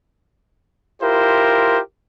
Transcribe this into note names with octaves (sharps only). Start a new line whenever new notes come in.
E4 F4 G4 A#4 C5